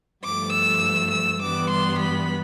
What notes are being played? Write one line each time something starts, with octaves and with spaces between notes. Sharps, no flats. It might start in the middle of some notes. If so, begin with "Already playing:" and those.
G2 F3 A3 D6
E6
E6
G2 E3 G3 B3 D6
C6
B5